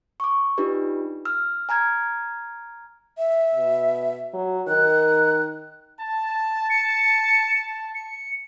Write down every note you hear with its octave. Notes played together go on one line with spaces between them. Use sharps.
C#6 D6
D4 D#4 F4 G4 B4
E6 F6
G#5 A#5 F6 G#6
E5
B2
F#3
D#3 F#6
A5
C#7
C#7